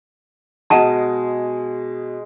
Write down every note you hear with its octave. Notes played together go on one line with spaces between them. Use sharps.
B2 G#3 D#5 F#5 A5 A#5